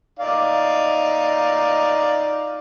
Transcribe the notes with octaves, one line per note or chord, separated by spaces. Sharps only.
D#4 D5 F5